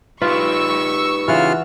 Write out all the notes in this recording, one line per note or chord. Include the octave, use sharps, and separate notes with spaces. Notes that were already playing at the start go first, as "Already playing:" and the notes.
D#4 F4 G4 B4 C#6 E6
C#3 E3 F4 F#5 F6